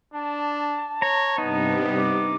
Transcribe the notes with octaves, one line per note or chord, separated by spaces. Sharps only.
D4 A5
C#5 A#5
G2 C3 B3 D#4
D6